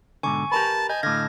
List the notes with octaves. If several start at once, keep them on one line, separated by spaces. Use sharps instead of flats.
G#2 B2 D3 G#5 C#6
G4 A#4 B4 A5
D#5 G#5 G6
A2 D3 F5 G#6 A#6